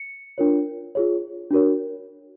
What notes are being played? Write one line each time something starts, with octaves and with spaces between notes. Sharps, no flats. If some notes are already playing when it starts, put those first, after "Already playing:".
Already playing: C#7
D4 F4 A#4 C#5
F4 G#4 C#5
D4 F#4 A#4 C#5